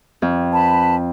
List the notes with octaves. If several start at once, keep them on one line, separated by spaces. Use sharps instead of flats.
F2
B4 A5 B5